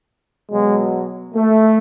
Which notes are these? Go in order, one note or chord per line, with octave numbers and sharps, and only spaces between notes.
B2 F#3 G#3
A3